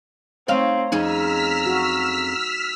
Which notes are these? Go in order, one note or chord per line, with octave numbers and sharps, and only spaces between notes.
A3 C4 D#4 C#5 F5
F2 C#4 D#4 G#4 A#5 E6 F6 B6
F#4